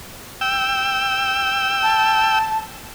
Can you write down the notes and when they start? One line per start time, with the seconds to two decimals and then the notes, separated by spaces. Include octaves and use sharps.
0.41 G5 E6
1.83 A5